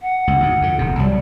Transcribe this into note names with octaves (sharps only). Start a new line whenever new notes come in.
F#5
C#2
D2 G#2
F2 D3
D#1 C3
C2 F#3 G3